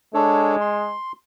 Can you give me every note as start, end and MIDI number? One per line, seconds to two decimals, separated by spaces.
0.14 0.95 56
0.14 0.56 62
0.14 0.56 69
0.14 0.56 73
0.61 1.12 84